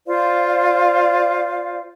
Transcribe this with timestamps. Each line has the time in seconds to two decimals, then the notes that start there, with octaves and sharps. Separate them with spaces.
0.07 F4 C5 D5 F5